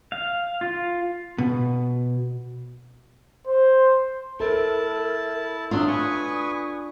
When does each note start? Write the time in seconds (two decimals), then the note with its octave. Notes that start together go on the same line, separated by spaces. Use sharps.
0.12 F5
0.61 F4
1.38 B2
3.47 C5
4.40 E4 A4 A#4 A5
5.71 F#3 D4 F4 E5 C6 D#6
5.88 B4 G#5 C#6